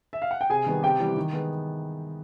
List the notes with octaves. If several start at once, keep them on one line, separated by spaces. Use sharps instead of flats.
E5
F5
F#5
G5
C3 G#4 G#5
D#3 G3 B3
C3 G4 G5
E3 G3 B3
D#3
G#3 B3